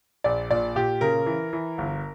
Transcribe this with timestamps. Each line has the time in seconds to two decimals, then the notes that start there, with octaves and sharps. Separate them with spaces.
0.24 A#1 D5
0.50 A#2 D5
0.76 A#2 G4
1.01 C#3 A#4
1.26 E3
1.53 E3
1.78 G1